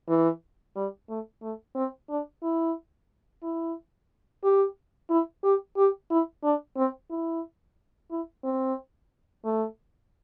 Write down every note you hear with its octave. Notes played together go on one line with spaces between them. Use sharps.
E3
G3
A3
A3
C4
D4
E4
E4
G4
E4
G4
G4
E4
D4
C4
E4
E4
C4
A3